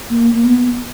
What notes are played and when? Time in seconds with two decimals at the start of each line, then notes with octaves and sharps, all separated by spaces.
0.10 A#3
0.34 A#3
0.45 B3